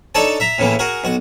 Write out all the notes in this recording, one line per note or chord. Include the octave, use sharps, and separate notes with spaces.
D4 D#4 A4 C#5 D5 A5
E5 A#5
A2 C#3 E3 A#3
F#4 G#4 A#4
B1 F#4